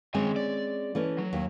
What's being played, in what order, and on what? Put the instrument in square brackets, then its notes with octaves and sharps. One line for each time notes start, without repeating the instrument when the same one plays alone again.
[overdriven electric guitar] D#3 G#5 [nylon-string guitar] G#3 C4 C#4
[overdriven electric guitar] D5
[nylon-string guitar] E3 A3 C#4
[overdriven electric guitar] F#3
[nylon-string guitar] D#2